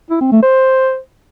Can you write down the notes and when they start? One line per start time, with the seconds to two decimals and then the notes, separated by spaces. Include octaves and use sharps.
0.10 E4
0.21 C4
0.32 A3
0.43 C5